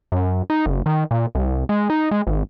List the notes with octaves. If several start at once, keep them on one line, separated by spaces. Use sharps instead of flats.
F#2
D#4
F#1
D#3
A#2
C2
G#3
D#4
G#3
G#1